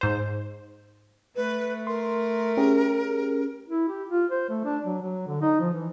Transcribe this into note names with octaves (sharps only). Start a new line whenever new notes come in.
G#2 C5
A3 B4
A#4 C6
C#4 G4 G#4
E4
G4
F4
C5
A3
D4
F#3
F#3
D3
D#4
F3
E3